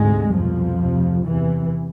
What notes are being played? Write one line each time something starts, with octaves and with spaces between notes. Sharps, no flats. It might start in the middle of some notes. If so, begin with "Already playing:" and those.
Already playing: D2 G#2 C3 G#3
C2 F2 B2 F3
D2 C3
E2 C3 E3